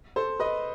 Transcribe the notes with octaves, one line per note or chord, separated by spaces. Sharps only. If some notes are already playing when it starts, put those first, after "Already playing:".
A4 C5
B4 D#5